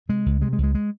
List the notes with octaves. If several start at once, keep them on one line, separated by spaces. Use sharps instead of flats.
C3 G#3
C#2
C3 G#3
G#3
C#2
G#3
G#3